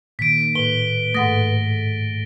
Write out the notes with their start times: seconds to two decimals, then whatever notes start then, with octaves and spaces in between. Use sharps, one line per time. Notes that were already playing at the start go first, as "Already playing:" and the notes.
0.19 A#2 D#3 B6 D7
0.55 A2 B4 G7
1.14 G#2 A3 F#5 D#6 A6 A#6